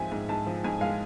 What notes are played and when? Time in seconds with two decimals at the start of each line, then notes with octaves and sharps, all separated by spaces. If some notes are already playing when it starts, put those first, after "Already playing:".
Already playing: G#2 F3 C4 E5 G#5
0.12 G#2
0.29 G#2 A5
0.46 F3
0.64 G#2 G#5
0.81 G#3 F5